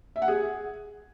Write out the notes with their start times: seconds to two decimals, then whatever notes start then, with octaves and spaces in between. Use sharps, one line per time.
0.16 E5
0.22 F#5
0.28 G#4